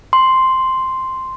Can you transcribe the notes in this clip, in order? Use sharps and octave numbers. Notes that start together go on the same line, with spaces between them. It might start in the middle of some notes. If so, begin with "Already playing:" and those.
C6